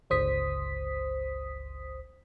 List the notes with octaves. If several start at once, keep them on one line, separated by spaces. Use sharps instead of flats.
G1 C#2 C5 D#6 B6